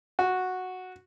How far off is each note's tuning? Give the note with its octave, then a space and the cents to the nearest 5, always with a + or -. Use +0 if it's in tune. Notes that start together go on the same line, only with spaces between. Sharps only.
F#4 -5